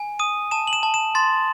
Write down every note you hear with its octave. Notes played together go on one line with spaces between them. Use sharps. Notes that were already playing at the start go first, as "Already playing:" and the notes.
Already playing: G#5
D#6 D#7
A5 E7
F#7
E7
A5
E7
C6 A6